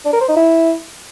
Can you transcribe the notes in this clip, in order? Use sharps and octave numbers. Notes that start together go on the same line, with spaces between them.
D4
A#4
C5
D#4
E4